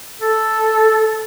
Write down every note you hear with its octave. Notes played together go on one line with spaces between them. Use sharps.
A4